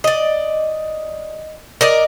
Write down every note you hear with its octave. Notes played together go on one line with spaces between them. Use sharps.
D5 D#5
A#4 D5 D#5